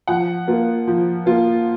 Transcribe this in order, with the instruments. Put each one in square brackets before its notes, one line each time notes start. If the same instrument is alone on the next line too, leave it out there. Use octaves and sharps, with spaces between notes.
[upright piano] F3 F#5
A#3 F4
F3
A#3 F4